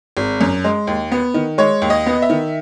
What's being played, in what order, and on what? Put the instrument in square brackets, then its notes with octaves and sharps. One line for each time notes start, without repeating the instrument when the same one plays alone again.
[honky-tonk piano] G#1
F#2
G#3
D#2
B3
D#3
G#3 C#5
D#2
D#5
B3
E5
D#3